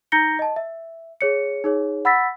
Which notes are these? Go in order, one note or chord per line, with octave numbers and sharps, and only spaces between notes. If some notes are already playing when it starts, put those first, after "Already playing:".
D#4 A#5 G6 A#6 C#7 G7
D#5 A5
E5
G#4 C#5 C#7
D#4 G#4 C#5
F#5 B5 E6 A6 B6